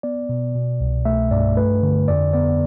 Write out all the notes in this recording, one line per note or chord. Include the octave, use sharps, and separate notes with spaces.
B3 D5
B2
B2
C2
A3 E5
G2 D5
A3 B4
D3
F2 D5
B3 D5